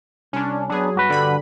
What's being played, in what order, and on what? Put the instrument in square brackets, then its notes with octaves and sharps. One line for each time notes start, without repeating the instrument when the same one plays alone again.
[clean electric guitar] C2 [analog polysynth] C#4 D4
[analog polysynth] F#3 G#4 [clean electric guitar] B3 D4
[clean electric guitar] G2 F#4 B4
[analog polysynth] D3 G3 B5